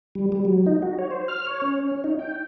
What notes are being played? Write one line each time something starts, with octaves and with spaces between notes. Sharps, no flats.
G3
G3
F#3
D#4
F#4
C#5
C5
F6
C#5
C#4
D#4
G5